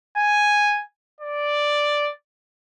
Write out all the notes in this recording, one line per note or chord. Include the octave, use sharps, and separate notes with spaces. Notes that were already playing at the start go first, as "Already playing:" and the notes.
G#5
D5